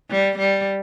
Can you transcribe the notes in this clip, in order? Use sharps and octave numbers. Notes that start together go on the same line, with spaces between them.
G3
G3